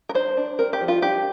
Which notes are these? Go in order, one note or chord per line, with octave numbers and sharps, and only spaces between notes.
A#4
D4 C5
D4
C4 A#4
G4
F3
F4
D4 G4